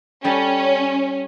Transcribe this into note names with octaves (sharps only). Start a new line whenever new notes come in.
G3 C#4 A4 C#5